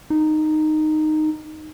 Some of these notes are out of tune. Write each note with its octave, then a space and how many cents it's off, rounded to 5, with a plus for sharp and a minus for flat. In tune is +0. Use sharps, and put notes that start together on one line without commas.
D#4 -10